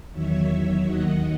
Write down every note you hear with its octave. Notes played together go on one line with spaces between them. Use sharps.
E2 D#3 F#3 C#5 E5
D#2 D#3 F#3 D#5 F#5